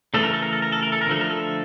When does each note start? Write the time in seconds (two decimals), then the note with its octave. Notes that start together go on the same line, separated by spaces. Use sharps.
0.14 C#3 E3 A3 A4
0.23 A#4
0.33 A4
0.43 A#4
0.53 A4
0.62 A#4
0.72 A4
0.83 A#4
0.92 A4
1.01 A#4
1.06 D3 F3 A3 A4
1.21 A#4
1.30 A4